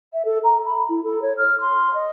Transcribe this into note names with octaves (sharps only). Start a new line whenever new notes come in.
E5
A4
A#5
B5
E4
A4
C#5
F6
C6
D#5